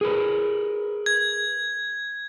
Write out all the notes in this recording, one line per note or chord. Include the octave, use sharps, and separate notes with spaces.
G#4 A#4 B4
G#6